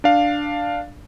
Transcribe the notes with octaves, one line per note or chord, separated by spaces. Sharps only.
D4 F5